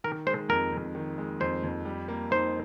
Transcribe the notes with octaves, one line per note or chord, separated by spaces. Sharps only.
D#3 A#4
G#3 C5
F2 A#4
F2
D#3
G#3
F2 C5
F2
G3
A#3
D#4 C5